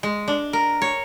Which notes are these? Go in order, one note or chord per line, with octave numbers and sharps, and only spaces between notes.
G#3
D4
A#4
C#5